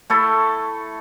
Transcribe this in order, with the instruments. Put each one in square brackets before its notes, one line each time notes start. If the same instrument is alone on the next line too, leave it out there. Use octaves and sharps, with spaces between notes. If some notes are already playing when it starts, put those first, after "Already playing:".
[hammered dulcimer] A3 E4 A4